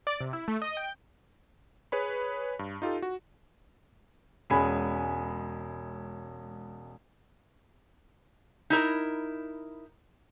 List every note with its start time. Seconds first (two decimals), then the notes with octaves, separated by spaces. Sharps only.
0.07 D5
0.21 C3
0.33 E4
0.48 A3
0.62 D#5
0.77 G5
1.92 G#4 B4 C#5 B5
2.59 G2
2.82 D#4 F4 G4 A4
3.02 F#4
4.50 E1 G#3 C#4 G#5 B5
8.70 D#4 E4 A#4